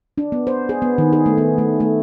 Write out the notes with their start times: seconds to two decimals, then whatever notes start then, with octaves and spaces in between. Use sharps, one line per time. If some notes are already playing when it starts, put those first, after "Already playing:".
0.18 D4
0.32 B3
0.47 C5
0.69 G#4
0.82 B3
0.98 D#3
1.13 G#4
1.26 A3
1.38 B3
1.58 A3
1.80 A3